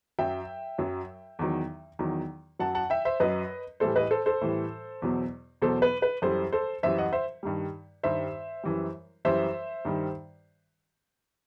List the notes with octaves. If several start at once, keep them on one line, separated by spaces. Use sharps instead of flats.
F#2 F#3 E5 G5
F#2 F#3
E2 D#3 F#3
E2 D#3 F#3
F#2 F#3 F#5 A5
F#5 A5
E5 G5
C5 E5
F#2 F#3 B4 D#5
A2 E3 G3 A4 C5
B4 D#5
A4 C5
A4 C5
A2 E3 G3
E2 B2 F#3
E2 B2 F#3 A4 C5
B4
B4
F#2 E3 G3 A4 C5
A4 C5
F#2 E3 G3 C5 E5
D#5 F#5
C5 E5
G2 D#3 G3
G2 D#3 G3 C5 E5
F#2 E3 G3
F#2 E3 G3 C5 E5
G2 D#3 G3